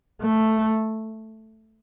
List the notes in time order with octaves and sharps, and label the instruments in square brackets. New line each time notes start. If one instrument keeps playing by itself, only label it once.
[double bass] A3